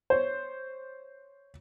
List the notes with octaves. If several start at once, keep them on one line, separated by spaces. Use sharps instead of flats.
C5 C#5